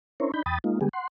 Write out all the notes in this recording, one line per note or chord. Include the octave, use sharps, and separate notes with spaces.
C#4 D4 E4 A#4 C5 C#5
D4 D#4 B5 G6
E2 G5 B5 D#6 A6
G#3 A#3 D#4 F4
D3 G3 G#3 B3 G4 G#4
F#5 C6